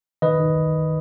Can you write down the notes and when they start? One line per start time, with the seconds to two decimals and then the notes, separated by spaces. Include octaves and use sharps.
0.22 D#3 B4 D#5
0.40 D#3